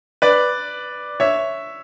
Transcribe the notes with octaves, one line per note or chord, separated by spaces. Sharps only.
B4 D5
C#5 E5